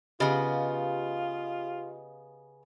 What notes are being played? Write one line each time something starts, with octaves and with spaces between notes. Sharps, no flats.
C#3 B3 F4 G4 D#5 F5